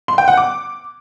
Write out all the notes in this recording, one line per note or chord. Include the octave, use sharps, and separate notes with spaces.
C6
G5
F#5
D6